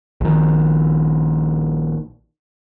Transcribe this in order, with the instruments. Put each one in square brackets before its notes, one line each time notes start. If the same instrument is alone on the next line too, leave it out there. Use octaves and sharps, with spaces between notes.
[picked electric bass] A#1 D#3